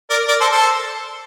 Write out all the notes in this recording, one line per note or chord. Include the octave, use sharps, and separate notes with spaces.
A#4 D5
A#4 D5
A4 C5
A4 C5